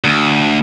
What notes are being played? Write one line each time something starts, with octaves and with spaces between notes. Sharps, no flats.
D2